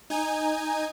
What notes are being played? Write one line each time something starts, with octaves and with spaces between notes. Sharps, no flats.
D#4 G#5